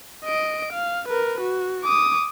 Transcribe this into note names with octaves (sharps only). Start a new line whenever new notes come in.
D#5 D7
F5
A#4 B4
F#4
D6 D#6